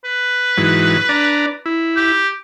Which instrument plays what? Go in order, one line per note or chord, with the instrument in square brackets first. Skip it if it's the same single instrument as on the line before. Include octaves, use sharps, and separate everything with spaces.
[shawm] B4
[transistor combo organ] G#2 E3 F#3
D4 D5 A#5
E4
[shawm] G4